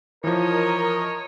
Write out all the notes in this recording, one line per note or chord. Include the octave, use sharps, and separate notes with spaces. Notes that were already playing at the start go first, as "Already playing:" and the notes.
E3 F3 A#4 C#5 D#5